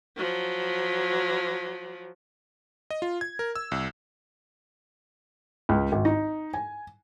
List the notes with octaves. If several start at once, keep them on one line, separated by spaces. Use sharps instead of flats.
F3 F#3
D#5
F4
G#6
A#4
E6
C2
C#2
G#1
D#4
G#5